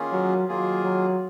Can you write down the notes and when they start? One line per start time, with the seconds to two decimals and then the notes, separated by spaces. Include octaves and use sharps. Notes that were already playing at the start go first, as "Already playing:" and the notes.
Already playing: D#3 A#3 C#4 F4 G#4
0.13 F#3
0.48 D#3 F#3 A#3 F4 G#4
0.84 F#3